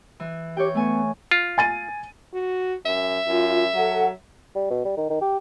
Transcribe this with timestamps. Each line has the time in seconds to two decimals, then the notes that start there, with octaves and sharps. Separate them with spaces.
0.20 E3
0.57 G4 C#5 G5
0.75 A3 B3 G#5 C#6
1.31 F4
1.58 G#5 A6 D#7
2.34 F#4
2.86 F#2 E5
3.27 F#2 F4
3.74 F#3 A4 F#5
4.55 G3
4.70 B2
4.85 G3
4.97 D#3
5.10 D#3
5.21 G4